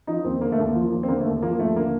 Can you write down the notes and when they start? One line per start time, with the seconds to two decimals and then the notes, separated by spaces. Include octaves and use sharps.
0.07 F3 D#4
0.24 D#2 C4
0.41 D3 A#3
0.52 A3
0.58 D#2 A#3
0.75 F3
0.92 D#2
1.03 C4
1.08 D3 A#3
1.20 A3
1.26 D#2
1.42 F3 A#3
1.59 D#2 A3
1.76 D3 A#3